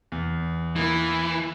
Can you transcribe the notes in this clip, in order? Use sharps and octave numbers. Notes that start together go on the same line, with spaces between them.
E2
E3 A#3 E4